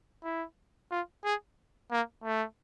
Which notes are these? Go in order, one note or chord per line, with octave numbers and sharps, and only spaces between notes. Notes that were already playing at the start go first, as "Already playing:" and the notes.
E4
F4
G#4
A#3
A3